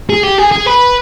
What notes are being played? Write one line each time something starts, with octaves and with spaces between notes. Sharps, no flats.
G#4
G4
G#4
G#4
B4